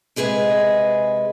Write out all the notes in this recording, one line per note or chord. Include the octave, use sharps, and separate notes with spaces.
C3 G#3 G#4 B4 D#5